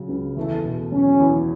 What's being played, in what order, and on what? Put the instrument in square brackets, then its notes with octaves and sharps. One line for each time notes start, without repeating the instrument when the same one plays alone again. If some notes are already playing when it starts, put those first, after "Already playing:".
Already playing: [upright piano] C#3 F#3
C#2
[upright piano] E2 [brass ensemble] A3
[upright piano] B2
[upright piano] F#3 [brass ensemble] C#4
[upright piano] E2